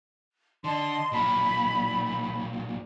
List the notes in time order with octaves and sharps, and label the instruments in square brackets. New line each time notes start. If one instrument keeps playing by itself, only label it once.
[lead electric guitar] D3 [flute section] D#5 A5 C6
[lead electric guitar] B1 A#2 [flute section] B5